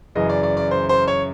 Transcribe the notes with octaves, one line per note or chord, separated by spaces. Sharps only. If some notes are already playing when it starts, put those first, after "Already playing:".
F#2 C#3 E3 D#5
D5
D5
D5
C5
C5
C#5